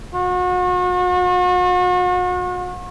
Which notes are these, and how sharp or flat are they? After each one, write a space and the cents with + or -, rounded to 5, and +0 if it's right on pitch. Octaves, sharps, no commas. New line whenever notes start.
F#4 -40